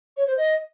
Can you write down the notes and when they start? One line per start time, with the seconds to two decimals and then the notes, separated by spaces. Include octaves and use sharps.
0.17 C#5
0.27 C5
0.37 D#5